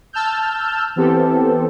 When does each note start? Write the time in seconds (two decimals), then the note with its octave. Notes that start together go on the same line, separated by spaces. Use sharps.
0.13 A5 E6 F6 G6
0.96 E3 B3 C4 G4 A4